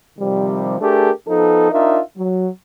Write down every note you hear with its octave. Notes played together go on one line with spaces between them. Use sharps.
C3 D#3 F3 G3
A3 D4 G4 G#4 A#4
F3 B3 D#4 A4
D4 D#4 F4 A#4 E5
F#3